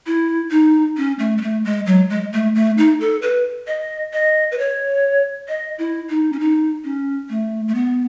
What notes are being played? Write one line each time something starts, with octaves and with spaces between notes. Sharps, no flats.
E4
D#4
C#4
A3
G#3
A3
G#3
F#3
G#3
A3
A3
D#4
A4
B4
D#5
D#5
B4
C#5
D#5
E4
D#4
C#4
D#4
C#4
A3
A3
B3